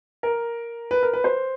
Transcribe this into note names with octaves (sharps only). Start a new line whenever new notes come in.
A#4
B4
A#4
B4
C5